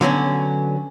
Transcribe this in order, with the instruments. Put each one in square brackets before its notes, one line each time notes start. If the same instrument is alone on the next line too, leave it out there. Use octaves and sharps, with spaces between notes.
[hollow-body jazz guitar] D3 F#3 B3 C#4